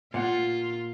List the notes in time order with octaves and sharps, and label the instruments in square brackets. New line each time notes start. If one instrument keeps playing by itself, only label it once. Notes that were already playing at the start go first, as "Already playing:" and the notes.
[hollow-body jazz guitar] A#2 F#5 [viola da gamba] F4